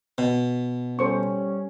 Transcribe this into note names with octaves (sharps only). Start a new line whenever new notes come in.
B2
G3 C#4 A4 C5 C#6